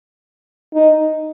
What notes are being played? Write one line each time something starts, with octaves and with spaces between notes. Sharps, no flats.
D#4